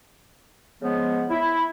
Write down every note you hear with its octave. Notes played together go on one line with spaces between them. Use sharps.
C#3 F3 G#3 B3
E4